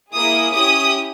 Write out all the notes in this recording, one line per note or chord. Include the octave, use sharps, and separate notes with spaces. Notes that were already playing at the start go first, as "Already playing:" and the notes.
A#3 E4 G#4 D#6
C#4 E4 G4 D#6